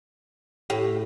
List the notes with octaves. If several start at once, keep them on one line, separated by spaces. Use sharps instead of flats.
A2 G4